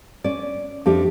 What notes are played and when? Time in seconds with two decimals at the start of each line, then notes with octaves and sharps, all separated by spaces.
0.24 C#4 D5
0.86 F2 D4 G4 E5